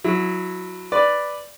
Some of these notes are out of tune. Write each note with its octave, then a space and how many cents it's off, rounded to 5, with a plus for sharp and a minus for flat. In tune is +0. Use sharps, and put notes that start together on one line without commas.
F#3 -15 E4 +0
B4 +0 D5 +0